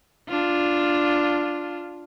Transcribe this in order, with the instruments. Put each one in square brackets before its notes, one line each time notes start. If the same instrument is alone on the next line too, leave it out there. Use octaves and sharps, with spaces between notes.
[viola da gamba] D4 F4